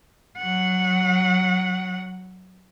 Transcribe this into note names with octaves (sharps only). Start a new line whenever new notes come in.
F#3 F#5